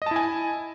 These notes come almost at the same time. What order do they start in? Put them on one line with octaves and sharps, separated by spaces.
D#5 A5 E4 G#5